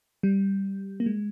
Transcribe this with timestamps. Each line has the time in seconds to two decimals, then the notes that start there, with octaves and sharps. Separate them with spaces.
0.23 G3
1.00 A#3
1.06 G#3